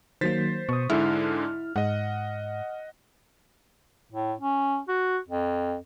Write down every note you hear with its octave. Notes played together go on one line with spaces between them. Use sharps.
D#3 F#3 A#3 C5 A6 B6
B2 C#6 D#6
G#2 D3 G#3 E4 F6
G#2 D#5 F#5
A2
C#4
F#4
F2